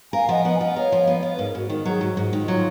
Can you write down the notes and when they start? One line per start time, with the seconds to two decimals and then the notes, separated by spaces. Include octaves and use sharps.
0.13 A#4 F5 G#5
0.29 F3 D#5 F#5
0.44 B3 D#5 F#5
0.55 G#5
0.61 F4 D#5 F#5
0.76 A#4 C#5 F5
0.92 F3
1.07 B3
1.14 D#5
1.22 F4 C#5
1.30 B4
1.38 G#2 A#4
1.54 G#2 F#4
1.69 D#3 A#4
1.85 F#3 G#4
2.01 G#2 F#4
2.17 G#2
2.22 F4
2.33 D#3
2.43 F4
2.48 F#3